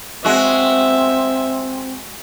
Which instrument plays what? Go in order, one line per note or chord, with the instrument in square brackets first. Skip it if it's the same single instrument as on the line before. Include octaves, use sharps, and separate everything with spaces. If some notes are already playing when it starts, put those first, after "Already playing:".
[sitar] G#3 F#4 [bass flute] C4 [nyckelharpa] E5